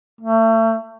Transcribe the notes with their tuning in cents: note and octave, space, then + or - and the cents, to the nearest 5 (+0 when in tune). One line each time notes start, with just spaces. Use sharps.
A3 +35